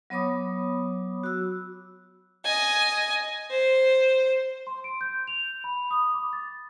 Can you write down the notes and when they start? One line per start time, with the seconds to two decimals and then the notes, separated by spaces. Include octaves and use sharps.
0.10 F#3 B3 C#5 B5 D6 D#6
1.23 F#4 E6
2.45 D#5 G#5
3.51 C5
4.67 C6
4.84 D7
5.01 G6
5.27 F7
5.64 B5
5.91 D#6
6.14 D6
6.33 A6